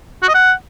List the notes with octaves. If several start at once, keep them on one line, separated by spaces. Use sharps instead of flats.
F#4
D#5
F#5